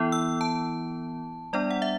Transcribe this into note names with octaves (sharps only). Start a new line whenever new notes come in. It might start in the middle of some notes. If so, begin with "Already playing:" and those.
Already playing: E3 B3 E4
E6
A5
G3 B3 D4 D5
F#5
E5